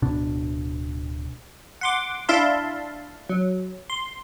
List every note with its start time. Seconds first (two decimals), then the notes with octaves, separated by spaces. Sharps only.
0.02 D1 B2 D4
1.81 F#5 C6 D6
2.29 D4 E4 E5 F5 A5 C6
3.29 F#3
3.90 C6